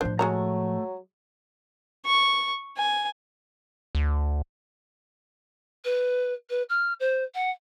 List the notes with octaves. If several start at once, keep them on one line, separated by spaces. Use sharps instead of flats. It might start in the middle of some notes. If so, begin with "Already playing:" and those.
A2 F3 D4 C5
F#3 G#3 A3 F#4 A#5
C#6
G#5
D2
B4
B4
F6
C5
F#5